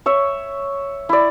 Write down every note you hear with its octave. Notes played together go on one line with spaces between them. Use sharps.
C#5 E5
E4 D5